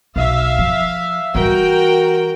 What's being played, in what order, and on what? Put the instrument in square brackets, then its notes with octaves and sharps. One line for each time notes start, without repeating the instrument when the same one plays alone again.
[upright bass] B1 [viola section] E5 F5
[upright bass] F3
[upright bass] E3 G3 [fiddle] F#4 A#4 [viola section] G5